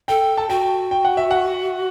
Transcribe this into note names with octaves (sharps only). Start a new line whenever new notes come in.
A4 G5
A5
F#4 G5
G5
F#5
E5
F#5